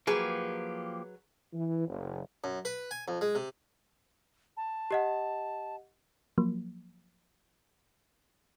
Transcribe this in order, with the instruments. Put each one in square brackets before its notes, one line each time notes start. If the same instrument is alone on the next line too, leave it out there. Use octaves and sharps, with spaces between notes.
[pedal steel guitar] F3 A#3 G4 [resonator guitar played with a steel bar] F#3 G#4 B4
[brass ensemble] E3
F#1
[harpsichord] F#2
B4
G#5
F2
G#3
C3
[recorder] A5
[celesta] G4 D#5 F#5
[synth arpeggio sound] F3 F#3 A#3